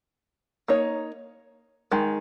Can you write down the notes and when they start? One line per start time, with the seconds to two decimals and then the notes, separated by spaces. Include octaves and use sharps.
0.68 A#3 D#4 C#5
1.91 D#3 G#3